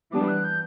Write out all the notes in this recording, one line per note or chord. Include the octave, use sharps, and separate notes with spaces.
E3 G3 B3 D4 D6
F#6
G6